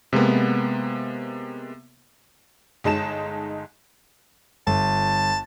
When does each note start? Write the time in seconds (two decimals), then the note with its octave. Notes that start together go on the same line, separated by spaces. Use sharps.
0.13 C3 G#3 A#3 B3
2.84 G1 G#3 D#4 A5 E7
4.67 G1 A5